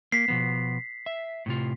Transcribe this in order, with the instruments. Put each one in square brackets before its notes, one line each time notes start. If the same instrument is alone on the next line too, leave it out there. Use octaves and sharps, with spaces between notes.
[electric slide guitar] A#3 [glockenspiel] B6 C7
[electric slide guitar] B2 F3 B3
E5
A2 C3 F4